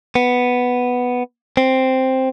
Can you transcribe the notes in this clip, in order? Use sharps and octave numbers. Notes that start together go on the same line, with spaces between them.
B3
C4